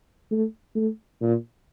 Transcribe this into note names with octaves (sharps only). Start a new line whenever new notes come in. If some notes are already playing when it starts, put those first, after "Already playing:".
A3
A3
A#2